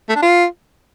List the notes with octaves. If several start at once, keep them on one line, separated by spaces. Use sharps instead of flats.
A3
D4
F4